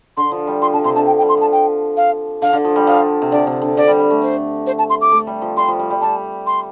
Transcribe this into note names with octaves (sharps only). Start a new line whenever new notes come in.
D3 C6
F3
G3
F3 C6
D3 A5
C3 C6
D3 A5
G5
G5
G3
C6
F3 A5
G5
F5
D3 F5
D3
F3
G3
F3 F5
C3
D3 D5
C3
D3
D3 D5
G3
G3
A3
C5
C5
A5
C6
D6
A3
G3
F3
G3 C6
F3
G3
G3
G3 A5
C6